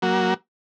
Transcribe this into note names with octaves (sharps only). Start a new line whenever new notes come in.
F#3 A#3 F#4